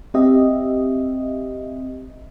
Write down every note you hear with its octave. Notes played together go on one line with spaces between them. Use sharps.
C4 G4 D#5 E5